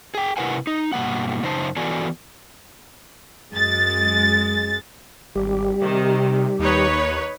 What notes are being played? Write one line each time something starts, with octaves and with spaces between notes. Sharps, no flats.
G#4 G5
C3 E4 A#4 B4 F#5 G#5
D#4
G2 B2 F3 A#3 F#5
F#2 C#3 D#4 C5 D#5 A5
E3 B3 F#4 A4 D5 G#5
F#2 G#3 A6
G#1 G3 G4
C3 D#3
D#2 D#4 B4 C#5